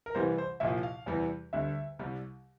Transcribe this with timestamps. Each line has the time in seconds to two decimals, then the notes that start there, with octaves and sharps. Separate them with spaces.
0.06 A#4
0.15 C2 C3 E3 G3 C5
0.38 C5
0.60 C2 A#2 F3 E5
0.83 F5
1.06 E2 C3 E3 G3
1.53 D2 D3 G3 E5
1.99 C2 C3 G3